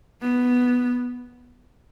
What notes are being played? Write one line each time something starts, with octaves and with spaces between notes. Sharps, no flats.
B3